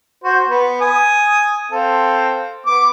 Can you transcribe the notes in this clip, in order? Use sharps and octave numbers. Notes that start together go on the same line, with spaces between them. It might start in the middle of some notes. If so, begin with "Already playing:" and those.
F#4 C5
B3
G#5 D#6
C4 A4 F5
B3 D6